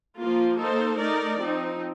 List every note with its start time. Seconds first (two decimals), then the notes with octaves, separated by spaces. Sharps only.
0.18 F3 A#3 F4
0.59 A#3 D#4 A4 C5
0.99 A3 D#4 A#4 D5
1.40 F3 C4 D#4